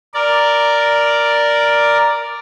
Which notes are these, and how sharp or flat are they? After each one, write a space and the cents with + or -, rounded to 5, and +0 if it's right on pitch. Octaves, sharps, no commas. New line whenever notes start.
A#4 +0 D5 +0